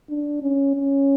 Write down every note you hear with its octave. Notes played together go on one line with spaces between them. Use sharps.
D4
C#4
C#4